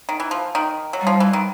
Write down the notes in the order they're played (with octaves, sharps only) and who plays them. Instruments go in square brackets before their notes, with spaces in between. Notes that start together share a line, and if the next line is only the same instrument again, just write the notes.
[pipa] D#3
E3
F3
D#3
F#3
[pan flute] G3
[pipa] F3
E3
D#3